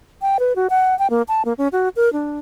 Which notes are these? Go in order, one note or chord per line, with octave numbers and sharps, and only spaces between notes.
G5
B4
F#4
F#5
G5
A#3
A5
A#3
C#4
F#4
A#4
D4